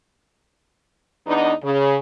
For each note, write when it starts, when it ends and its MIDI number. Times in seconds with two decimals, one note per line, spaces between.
1.27 1.53 40
1.27 1.53 59
1.27 1.53 62
1.27 1.53 63
1.64 1.97 49